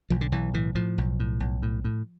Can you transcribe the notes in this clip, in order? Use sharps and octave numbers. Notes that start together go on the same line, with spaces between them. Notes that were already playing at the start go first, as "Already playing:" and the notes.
B1 F3
D3
B1 E3
A2 E3
A2 F3
B1
A2
B1
A2
A2